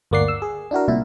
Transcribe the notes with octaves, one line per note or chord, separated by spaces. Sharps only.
G1 D2 A#3 D5 F#5 C7
E6
G#4
D4 E4 F#4 A#4
C2 A#2 E4